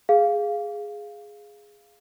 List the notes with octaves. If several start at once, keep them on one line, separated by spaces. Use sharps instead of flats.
G#4 F5